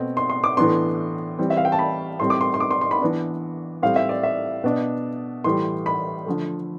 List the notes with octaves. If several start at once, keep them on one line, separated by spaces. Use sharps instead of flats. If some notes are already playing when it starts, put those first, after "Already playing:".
Already playing: B2 A3 C4
C6
C6
D6
A2 E3 B3 D4 C6
E3 G3 C4
E5
F5
G5
A5
B5
A2 G3 C4 C6
D6
C6
C6
D6
C6
C6
B5
E3 B3 D4
A2 G3 C4 F5
E5
D5
E5
B2 B3 D4
A2 E3 G3 C6
B5
D3 F3 A3